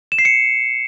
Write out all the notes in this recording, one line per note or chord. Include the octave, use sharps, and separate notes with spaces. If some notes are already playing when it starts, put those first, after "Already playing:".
E7
C7
C#7